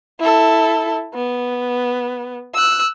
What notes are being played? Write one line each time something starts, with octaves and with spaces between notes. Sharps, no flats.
E4 A4
B3
E6 F#6